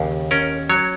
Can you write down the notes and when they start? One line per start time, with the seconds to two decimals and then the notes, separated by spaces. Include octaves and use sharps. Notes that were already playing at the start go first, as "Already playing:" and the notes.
Already playing: D#2 C#3
0.31 C#4 A#4
0.69 F#3 C#5